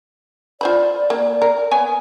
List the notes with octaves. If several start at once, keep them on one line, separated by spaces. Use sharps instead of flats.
F4 C5 D5 B5
A#3
A#4
B3 C#5 G#5